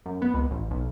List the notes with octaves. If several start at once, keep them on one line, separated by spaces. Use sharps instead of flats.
F#2
B3
C#2
A1
B1